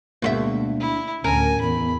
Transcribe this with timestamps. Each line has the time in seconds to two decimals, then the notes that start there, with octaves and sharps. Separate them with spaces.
0.22 D2 B2 G#3 A#3 F4 E5
0.80 E4
1.24 D2 A2 C#4 A#4 G#5
1.61 E2 B5